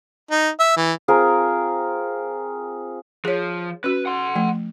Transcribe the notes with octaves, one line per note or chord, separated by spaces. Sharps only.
D#4
E5
E3
C4 F4 G#4 A#4
F3 G#4 C#5
C#4 F#4 B4
F#5 C6
F3 A3